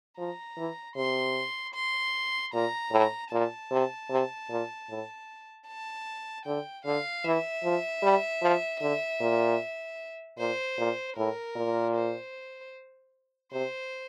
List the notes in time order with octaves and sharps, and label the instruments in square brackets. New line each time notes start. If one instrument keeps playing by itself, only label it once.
[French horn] F3 [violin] A#5
[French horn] E3
[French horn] C3 [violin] C6
[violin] C6
[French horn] A#2 [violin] A#5
[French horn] A2
[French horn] A#2 [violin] A5
[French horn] C3
C3
A#2
A2
[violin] A5
[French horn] D3 [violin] G5
[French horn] D3 [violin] F5
[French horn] E3 [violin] E5
[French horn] F3
G3
F3
D3
A#2
[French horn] A#2 [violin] C5
[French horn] A#2
[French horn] A2 [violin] A#4
[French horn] A#2
[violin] C5
[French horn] C3 [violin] C5